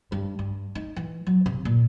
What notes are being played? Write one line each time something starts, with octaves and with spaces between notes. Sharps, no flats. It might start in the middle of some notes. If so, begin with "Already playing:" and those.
G2
G2
D#4
E3
F#3
C3
A#2